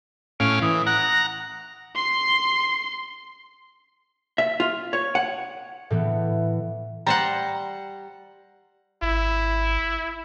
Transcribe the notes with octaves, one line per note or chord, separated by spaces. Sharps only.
A2 C#4 F5 D7
E3 D#6
F#5 A#5 F#6
A#6
C6 C7
E5
F4
C#5
F#5
A2 E3 B3
G3 C5 F#5 A#5
G#1 E4